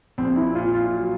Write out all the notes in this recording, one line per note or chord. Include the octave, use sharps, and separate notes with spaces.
A#1 C4
E4
A#2 F4
F4
F#3